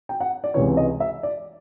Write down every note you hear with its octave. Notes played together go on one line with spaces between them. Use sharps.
G5
F#5
D5
C#2 C3 E3 C#5
D#5
E5
D5